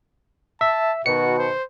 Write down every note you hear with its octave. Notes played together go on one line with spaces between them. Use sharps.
E5 A5
B2 D#3 F#4 C#7
C5